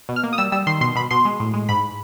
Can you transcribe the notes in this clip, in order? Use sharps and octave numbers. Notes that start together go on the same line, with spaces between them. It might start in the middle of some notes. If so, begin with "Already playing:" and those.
B2
F6
A#3
D#6
G3 E6
G3 E6
D#3 C6
B2 C6
B2 B5
B2 C6
G#3
A2
G#3
G#2 B5